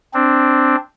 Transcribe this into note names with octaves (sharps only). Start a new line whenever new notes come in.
C4 D4